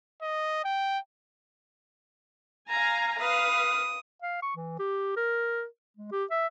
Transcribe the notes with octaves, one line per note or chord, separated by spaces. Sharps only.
D#5
G5
F5 G#5 A#5
B4 F5 D#6
F5
C#6
E3
G4
A#4
G#3
G4
E5